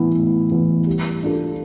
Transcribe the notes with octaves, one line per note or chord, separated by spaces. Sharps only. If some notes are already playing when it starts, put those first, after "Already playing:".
Already playing: A2 E3 B3 E4
A2
E3 B3 E4
G3
D4 F4 A4